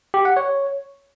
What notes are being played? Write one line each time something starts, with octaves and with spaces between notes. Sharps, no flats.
G4
F#5
C#5